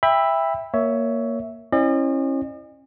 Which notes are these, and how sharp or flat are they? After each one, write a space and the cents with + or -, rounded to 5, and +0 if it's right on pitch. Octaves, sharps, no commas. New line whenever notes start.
E5 +0 G5 +30 B5 +0
A#3 +0 C#5 +15 E5 -5
C#4 -40 E4 +0 D#5 -45